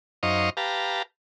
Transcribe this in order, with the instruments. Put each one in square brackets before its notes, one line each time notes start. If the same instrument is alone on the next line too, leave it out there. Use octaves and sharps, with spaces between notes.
[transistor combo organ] F#2 D#4 C5 D#5 F5 C#6
G4 B4 F5 A5 A#5